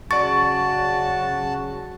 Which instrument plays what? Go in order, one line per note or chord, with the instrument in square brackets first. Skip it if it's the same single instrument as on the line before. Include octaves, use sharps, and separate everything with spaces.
[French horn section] C#3 F#3 [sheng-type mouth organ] F#4 A5 [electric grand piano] D5 C#6 [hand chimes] A6